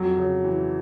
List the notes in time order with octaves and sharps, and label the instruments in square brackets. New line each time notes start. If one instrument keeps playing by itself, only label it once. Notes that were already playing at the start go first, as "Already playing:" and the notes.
Already playing: [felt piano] F2 [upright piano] F#3
[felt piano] C#3
E3